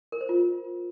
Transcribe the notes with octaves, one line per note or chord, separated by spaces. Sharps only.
A#4
C5
F4